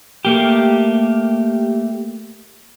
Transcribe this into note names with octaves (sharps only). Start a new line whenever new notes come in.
A3 A#3 G4